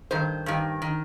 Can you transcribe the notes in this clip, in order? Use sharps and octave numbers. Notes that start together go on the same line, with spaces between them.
G2 D#3 C5
G2 D#3
D#3